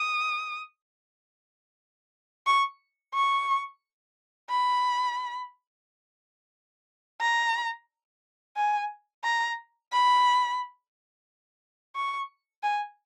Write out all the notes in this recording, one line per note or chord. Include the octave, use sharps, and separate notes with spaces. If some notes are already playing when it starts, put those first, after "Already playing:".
Already playing: D#6
C#6
C#6
B5
A#5
G#5
A#5
B5
C#6
G#5